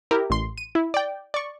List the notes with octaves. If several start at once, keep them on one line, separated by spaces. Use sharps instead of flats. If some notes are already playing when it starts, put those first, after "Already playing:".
E4 G4 A#4
A1 C6
D#7
E4
D5 G5
D5 C#6